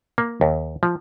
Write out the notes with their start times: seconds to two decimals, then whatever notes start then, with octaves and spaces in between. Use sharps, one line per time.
0.18 A#3
0.41 D#2
0.83 F3